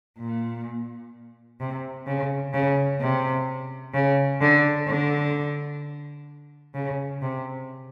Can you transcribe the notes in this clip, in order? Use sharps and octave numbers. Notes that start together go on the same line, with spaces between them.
A#2
C3
C#3
C#3
C3
C#3
D3
D3
C#3
C3